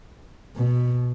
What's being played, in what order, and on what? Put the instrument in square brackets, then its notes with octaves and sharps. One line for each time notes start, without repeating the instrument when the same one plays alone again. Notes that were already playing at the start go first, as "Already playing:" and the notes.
[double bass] B2